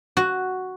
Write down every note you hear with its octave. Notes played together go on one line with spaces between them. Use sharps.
F#4